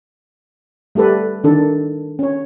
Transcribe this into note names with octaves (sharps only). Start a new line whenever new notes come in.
G3 A3 G4 A4 B4
D#3 D4 A4
C#4 C#5